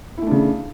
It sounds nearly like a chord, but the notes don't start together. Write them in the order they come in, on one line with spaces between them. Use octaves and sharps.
E4 A3 D4 C#3